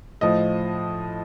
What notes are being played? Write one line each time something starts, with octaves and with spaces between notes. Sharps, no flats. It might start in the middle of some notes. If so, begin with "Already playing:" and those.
A2 F3 D#5